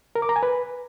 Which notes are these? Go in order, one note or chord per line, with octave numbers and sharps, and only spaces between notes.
A#4
D6
A#5
G#5
B4